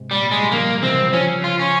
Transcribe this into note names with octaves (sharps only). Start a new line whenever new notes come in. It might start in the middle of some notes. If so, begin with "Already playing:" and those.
Already playing: G#2 C3
A#2 G3
G#3
G3
C#3 F3 A#3
C3 E3 C4
G3
C#3 F3 C#4
F4
C#4